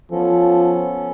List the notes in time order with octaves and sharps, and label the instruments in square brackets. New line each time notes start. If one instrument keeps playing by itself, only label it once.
[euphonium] F3 [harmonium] B3 C#4 A4